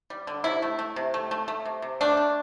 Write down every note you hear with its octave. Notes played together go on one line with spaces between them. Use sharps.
G3
D3
C3 E4
A3
A3
C3
A3
A3
A3
C3
C3
A3 D4
A3